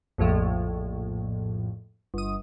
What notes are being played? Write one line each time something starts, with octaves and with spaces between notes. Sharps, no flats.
A#1 F2 A2 F3
G1 D#6